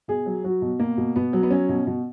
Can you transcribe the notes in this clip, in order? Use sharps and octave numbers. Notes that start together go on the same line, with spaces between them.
B2 G#4
F#3
F#3 F#4
B2
B2 A#3
B2
B2 B3
F#3
B3
F#3 C#4
B2
B2